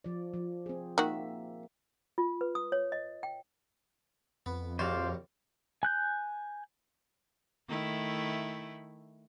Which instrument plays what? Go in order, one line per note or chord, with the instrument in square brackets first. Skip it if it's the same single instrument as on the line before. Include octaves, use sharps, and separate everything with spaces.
[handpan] F3 D5
F3
C4 G#4
[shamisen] D#3 F#4 [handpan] A#3 E5
[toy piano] F4
B4
D#6
C#5
D#5
G5
[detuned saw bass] F2 [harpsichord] B3
[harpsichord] A#1 D#2 F#4 [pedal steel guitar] C5 D5 F5
[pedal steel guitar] G#5 F#6 G6
[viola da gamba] D#3 A3 E4